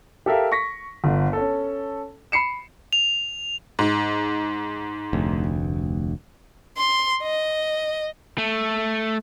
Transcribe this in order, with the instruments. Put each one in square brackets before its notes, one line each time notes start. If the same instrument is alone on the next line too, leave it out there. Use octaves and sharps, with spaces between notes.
[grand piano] G4 A4 A#4 E5 F5
C#6 A#6 B6
G1 D3
C#4 A4
B5 C7 C#7 E7
[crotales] F7
[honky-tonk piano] G#2
[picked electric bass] F1 D2
[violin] C6
D#5
[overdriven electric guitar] A3